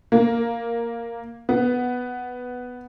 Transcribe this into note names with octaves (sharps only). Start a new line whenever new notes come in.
A#3
B3